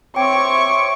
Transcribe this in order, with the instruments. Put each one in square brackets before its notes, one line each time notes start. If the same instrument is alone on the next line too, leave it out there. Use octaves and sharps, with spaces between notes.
[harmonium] C4 C#5 [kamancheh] E5 C#6 [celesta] G5 [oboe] D6